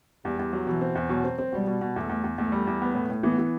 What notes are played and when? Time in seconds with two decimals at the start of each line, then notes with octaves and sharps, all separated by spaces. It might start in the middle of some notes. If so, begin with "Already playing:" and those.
0.24 E2 G3
0.39 E2
0.53 F#3
0.67 B2 E3
0.81 C4
0.95 E2
1.09 B2 F#3
1.24 C4
1.38 C4
1.52 B2 G3
1.67 B2
1.81 B2
1.95 E2 A3
2.09 E2
2.24 E2
2.38 E2 A3
2.52 G3
2.67 E2
2.82 B3
2.95 A2
3.10 A2
3.23 E3 B3
3.39 E3